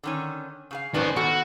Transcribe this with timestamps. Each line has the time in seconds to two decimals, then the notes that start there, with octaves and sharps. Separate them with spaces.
0.03 D3 D#3 C#4
0.71 C#3 G#4 F5
0.94 D#3 C#4 B4 C5 D5
1.16 D#3 B3 F#4 A4